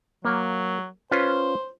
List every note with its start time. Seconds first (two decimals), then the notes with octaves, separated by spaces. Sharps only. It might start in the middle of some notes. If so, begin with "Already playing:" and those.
0.25 F#3 A#3
1.11 C#4 F4 B4 C5